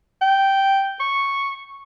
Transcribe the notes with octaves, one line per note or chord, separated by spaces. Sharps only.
G5
C#6